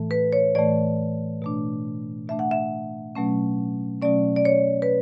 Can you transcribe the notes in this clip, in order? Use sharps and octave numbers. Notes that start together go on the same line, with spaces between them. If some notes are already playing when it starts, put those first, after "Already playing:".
Already playing: A2 E3 A3
B4
C#5
A2 E3 A3 D5
B2 A3 D4
B2 A3 D4 E5
F#5
E5
B2 F#3 A3 C#4
B2 F#3 A3 C#4 D5
D5
C#5
B4